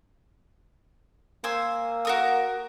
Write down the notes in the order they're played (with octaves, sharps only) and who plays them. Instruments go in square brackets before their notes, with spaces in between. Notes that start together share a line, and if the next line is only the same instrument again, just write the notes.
[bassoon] A#3 [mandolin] C5 G#5 E6
[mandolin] F#4 A#4 D#6